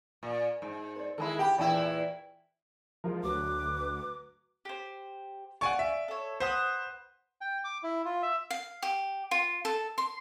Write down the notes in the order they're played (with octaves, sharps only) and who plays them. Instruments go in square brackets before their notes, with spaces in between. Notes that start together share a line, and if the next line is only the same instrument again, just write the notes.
[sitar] A#2
G#2
[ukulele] C5 D5
[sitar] D#3 G#3 E4 [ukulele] A4 G#5 B5
[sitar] G4 [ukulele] G5 B5
[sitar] E2 A#2 E4 [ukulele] D5 G5 G#5
[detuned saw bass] F3 [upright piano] G#3 F4 A#4
[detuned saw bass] D2 [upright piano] F#3 F#4 [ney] B4 [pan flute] D6
[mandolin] G4 C5
[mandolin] D5 F5 [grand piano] F#5 G#5 C#6
[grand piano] E5
[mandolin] A4 C#5
[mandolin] B4 F#5 D#6 [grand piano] C5
[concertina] G5
D6
E4
F4
E5
[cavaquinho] F5
G4
F4
A4
C6